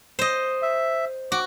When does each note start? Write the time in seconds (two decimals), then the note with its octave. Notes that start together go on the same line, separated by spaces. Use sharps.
0.19 C5 D#5
0.62 E5
1.32 F#4 D6